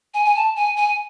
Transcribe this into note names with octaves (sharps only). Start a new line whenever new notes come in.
G#5
G#5
A5
G#5
G#5